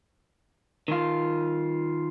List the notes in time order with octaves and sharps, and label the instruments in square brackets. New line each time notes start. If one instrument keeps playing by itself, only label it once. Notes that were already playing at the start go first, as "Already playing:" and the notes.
[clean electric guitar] D#3 F4